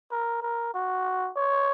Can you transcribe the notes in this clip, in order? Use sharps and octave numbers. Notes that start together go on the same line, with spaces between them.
A#4
A#4
F#4
C#5